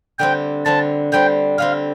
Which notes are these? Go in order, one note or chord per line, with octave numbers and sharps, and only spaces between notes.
D3 G3 C4 G5
D3 G3 C4 A5
D3 G3 C4 G5
D3 G3 C4 F5